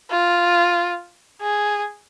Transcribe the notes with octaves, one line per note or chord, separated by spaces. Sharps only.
F4
G#4